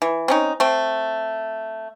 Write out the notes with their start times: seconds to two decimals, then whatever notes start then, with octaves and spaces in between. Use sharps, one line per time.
0.02 E3
0.28 C4 C#4 D#4
0.60 A3 C4